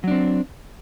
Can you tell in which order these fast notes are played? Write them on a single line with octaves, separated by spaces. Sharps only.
F#3 D4 C4